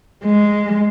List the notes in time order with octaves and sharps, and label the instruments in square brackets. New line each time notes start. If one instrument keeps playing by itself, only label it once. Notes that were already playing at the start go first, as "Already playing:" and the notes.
[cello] G#3